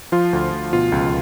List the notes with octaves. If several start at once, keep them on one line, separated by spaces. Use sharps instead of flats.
F3 F4
D2
D2
B2 F4
C#2